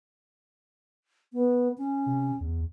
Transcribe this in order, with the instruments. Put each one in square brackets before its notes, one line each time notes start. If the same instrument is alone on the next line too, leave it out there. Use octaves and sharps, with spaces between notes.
[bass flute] B3
C#4
[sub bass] C3
E2